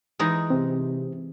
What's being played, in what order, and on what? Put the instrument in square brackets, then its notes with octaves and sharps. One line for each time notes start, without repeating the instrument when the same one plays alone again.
[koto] E3 G#3 D#4
[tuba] C3 [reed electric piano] C4